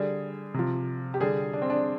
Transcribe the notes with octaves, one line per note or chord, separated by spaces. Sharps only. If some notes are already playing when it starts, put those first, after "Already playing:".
Already playing: D3 G3 G#4
C3 F3
G4
D3 G3 G#4
D4
C4
D4